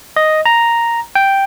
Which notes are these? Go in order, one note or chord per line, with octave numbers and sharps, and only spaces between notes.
D#5
A#5
G5